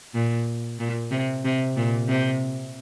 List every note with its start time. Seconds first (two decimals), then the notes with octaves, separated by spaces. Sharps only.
0.14 A#2
0.79 A#2
1.11 C3
1.45 C3
1.76 A#2
2.08 C3